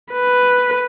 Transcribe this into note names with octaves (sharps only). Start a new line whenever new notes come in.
B4